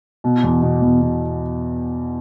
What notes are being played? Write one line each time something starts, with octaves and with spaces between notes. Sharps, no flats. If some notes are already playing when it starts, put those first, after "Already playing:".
B2
E2
B2
E2
B2